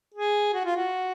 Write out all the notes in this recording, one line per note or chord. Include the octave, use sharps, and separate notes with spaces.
G#4
F#4
F4
F#4